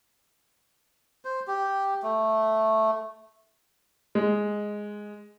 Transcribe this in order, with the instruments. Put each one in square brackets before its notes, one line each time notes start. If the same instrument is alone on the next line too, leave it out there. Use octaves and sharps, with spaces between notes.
[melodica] C5
G4
A3
[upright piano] G#3